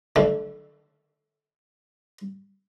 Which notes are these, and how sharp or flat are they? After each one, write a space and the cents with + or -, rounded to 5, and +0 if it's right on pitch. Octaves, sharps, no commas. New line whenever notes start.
D3 +30 F#3 +0 A3 -20